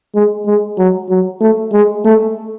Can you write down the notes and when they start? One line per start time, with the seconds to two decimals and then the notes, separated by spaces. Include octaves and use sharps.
0.15 G#3
0.46 G#3
0.78 F#3
1.10 F#3
1.41 A3
1.73 G#3
2.05 A3